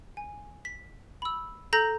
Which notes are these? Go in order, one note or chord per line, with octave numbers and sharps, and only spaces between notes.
G#5
B6
B5 E6
A4 A#5 G6 A#6